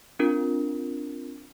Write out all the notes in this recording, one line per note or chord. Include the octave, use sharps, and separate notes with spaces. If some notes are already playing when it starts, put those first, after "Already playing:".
C4 D4 F4 A#4